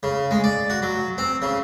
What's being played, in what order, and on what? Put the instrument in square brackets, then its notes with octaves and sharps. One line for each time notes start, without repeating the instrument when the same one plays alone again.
[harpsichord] C#3
G#3
D5
F#4
F#3
C4
C#3